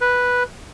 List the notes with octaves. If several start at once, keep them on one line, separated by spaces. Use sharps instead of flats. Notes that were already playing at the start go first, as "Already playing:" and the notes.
B4